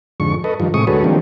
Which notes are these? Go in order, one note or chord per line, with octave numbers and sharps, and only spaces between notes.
F2 G#2 D3 C#6
A4 B4 D#5
G2 D#3 F3
A2 C3 G#3 C#6 D#6
D2 G#3 F#4 A4 B4 C#5
D#3 F3 G3 A#3 C4 D4